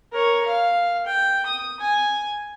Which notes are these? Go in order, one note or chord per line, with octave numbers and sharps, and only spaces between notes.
A#4 C#5
F5
G5
D#6
G#5